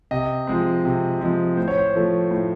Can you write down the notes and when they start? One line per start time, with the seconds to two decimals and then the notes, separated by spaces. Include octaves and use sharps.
0.11 C3 D#5
0.47 F3 G#3 C4
0.85 C3
1.21 F3 G#3 C4
1.57 A2 C5
1.68 C#5
1.78 C5
1.95 F3 A3
2.31 A2